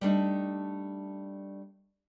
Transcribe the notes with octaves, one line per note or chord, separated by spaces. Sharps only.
G3 A3 D4 D#4